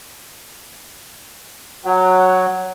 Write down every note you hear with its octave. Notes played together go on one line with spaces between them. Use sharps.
F#3 F#5